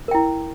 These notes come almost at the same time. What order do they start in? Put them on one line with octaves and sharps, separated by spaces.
A#4 G5 E4